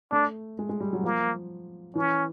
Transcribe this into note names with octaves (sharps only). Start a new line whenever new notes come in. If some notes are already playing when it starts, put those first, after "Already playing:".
A3 D4
G#3
G#3
G3
F#3
F3 A#3
E3 C#4